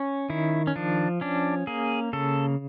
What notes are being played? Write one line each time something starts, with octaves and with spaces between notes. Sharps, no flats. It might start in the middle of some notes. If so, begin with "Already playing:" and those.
Already playing: C#4
D#3 E4
C#4
F3 D4
C#4 D4
A#3 G#4
C#3 A4